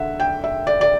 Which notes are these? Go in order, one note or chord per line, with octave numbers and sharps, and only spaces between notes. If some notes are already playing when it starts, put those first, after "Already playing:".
Already playing: D3 E5 F#5
G5
E5
D5
D5